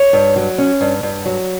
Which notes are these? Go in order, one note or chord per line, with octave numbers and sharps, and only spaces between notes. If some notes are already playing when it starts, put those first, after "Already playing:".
Already playing: C#5
G2
F#3
C#4
G2
G2
F#3